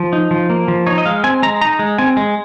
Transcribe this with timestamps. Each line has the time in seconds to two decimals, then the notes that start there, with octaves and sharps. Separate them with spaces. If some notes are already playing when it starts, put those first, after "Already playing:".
Already playing: F3
0.13 D#4
0.31 F3
0.50 A#3
0.68 F3
0.87 D#4 C#5
0.98 D#5
1.06 G#3 F5
1.24 C4 G#5
1.43 G#3 A#5
1.61 D#4 A#5
1.79 G#3
1.98 C4 G#5
2.17 G#3